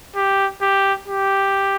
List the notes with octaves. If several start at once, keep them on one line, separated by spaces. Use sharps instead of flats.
G4
G4
G4